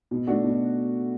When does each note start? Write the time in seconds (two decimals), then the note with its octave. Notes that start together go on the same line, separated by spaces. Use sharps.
0.11 B2
0.27 A3 D4 F#4
0.44 B2